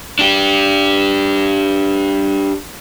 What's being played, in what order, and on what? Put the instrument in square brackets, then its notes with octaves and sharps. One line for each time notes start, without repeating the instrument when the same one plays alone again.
[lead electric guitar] D4 G4